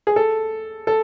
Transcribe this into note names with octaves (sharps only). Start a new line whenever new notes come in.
G#4
A4
A4